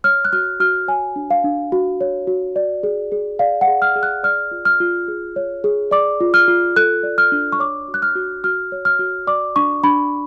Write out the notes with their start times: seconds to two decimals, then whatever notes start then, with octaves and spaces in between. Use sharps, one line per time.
0.04 C#5 F6
0.25 F#6
0.33 F#4 F6
0.60 F#4 F6
0.88 C#5 G#5
1.16 D4
1.31 F5
1.44 D4
1.72 F#4
2.01 C#5
2.27 F#4
2.56 D5
2.83 G#4
3.12 G#4
3.39 D5 F5
3.61 F#5
3.68 G#4
3.82 F6
3.96 G#4
4.03 F#6
4.23 D5 F6
4.51 F4
4.65 F6
4.80 F4
5.08 G#4
5.36 C#5
5.64 G#4
5.91 D5 D6
6.20 F4
6.34 F6
6.48 F4
6.76 A4 F#6
7.03 D5
7.18 F6
7.32 D4
7.52 C#6
7.59 C#5 D6
7.88 F#4
7.94 F#6
8.02 F6
8.15 F#4
8.44 F#4 F6
8.72 C#5
8.85 F6
8.99 F#4
9.27 D5 D6
9.56 D4 C#6
9.84 D4 B5